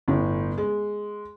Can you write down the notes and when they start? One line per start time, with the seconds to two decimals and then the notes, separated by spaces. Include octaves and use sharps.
0.08 G1 A2
0.58 G#3